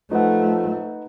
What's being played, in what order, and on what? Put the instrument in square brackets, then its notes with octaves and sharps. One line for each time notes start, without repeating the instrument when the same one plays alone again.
[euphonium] F3 [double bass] A3 [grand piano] D#4 B4 F#5